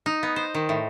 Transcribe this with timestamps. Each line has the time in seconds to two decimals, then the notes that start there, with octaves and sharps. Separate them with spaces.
0.06 D#4
0.23 B3
0.36 C5
0.54 D#3
0.69 A2